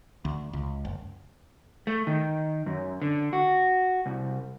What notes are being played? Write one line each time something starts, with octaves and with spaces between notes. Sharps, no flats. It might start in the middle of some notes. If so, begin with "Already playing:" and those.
D2
C#2
F#1
A3
D#3
F#2
D3
F#4
C2